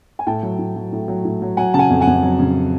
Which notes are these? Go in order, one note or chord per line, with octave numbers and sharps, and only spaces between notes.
G#5
A2 G5 A5
F#3
A2
F#3
A2
F#3
A2
F#3
F#3 F#5 G#5
C#3 A5
F#5 G#5
F2
F#5 G#5
F2
F#3
C#3